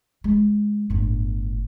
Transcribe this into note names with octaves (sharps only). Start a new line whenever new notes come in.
G#3
G1 A2